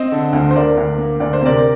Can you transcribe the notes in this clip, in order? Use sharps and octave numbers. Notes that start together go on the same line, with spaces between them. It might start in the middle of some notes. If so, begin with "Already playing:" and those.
Already playing: C4 C5 D#5
D3
D2
C5
D2 A#4 D5
D2
A#3
D2 D5
C5
C3 A#4 D5